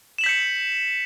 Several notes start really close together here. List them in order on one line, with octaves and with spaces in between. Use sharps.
E7 F#7 B6 G6 C#7